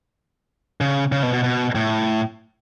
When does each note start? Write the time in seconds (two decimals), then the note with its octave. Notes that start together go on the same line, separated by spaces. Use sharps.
0.81 C#3
1.12 C#3
1.23 B2
1.33 B2
1.44 B2
1.75 A2